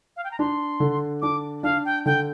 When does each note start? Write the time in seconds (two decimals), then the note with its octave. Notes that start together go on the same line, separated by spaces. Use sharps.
0.16 F5
0.24 G5
0.31 A#5
0.39 D4 C6
0.80 D3
1.22 D4 D6
1.63 D4 F5
1.85 G5
2.06 D3 G5